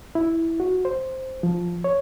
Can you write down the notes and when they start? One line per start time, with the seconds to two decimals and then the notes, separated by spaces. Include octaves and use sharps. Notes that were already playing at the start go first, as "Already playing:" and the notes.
0.15 E4
0.60 F#4
0.85 C5
1.43 F3
1.84 C#5